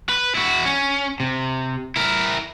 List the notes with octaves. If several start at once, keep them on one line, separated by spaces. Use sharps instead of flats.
B4
E4 F#4
C#4
C3
E4 A#4